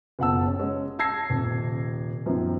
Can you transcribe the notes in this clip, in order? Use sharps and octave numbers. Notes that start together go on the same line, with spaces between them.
F#1 B2 F4 F#5 A5 E6
C#4
G#3 C#4
A5 E6 G#6 A#6 C7
D#1 C3
F#2 D#3 F3 B3 C4